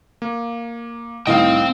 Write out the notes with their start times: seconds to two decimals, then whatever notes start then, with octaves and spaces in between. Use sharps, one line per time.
0.22 A#3
1.27 C2 A2 D#3 C4 D#5 F5 G5